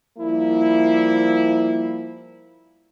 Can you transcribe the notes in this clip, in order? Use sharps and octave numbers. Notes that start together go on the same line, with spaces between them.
F3 G3 A#3 E4